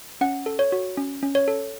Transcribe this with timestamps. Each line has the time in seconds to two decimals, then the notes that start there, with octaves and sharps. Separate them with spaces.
0.21 C#4 F#5
0.46 A4
0.59 C#5
0.72 F#4
0.97 C#4
1.23 C#4
1.35 C#5
1.48 A4